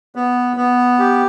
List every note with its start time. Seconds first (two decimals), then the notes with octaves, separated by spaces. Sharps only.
0.16 B3
0.57 B3
0.99 G4